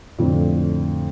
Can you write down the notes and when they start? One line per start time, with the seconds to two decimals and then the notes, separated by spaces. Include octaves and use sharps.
0.18 F2 A2 D3 F3